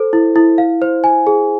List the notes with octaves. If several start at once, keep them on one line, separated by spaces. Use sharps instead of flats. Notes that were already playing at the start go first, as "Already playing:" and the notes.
Already playing: A4 C5
E4
E4
F5
C5
G#5
G#4